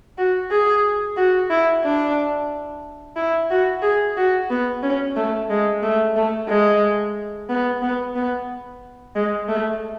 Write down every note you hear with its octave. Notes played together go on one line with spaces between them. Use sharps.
F#4
G#4
F#4
E4
D4
E4
F#4
G#4
F#4
B3
C#4
A3
G#3
A3
A3
G#3
B3
B3
B3
G#3
A3